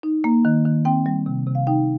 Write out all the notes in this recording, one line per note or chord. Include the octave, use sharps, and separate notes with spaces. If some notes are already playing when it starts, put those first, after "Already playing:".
D#4
A#3
D#3
D#3
C4 G5
G3
C3
C3
F5
D#4 G5